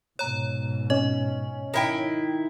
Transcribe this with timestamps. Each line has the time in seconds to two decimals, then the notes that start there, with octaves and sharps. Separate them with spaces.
0.19 G#2 B2 C#5 A#5
0.90 C#4 D#5
1.74 D#3 E4 G5